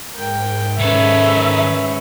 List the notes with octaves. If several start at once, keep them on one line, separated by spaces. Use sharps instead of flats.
G#2 A#4 G5
D#3 C#4 A4 B4 E5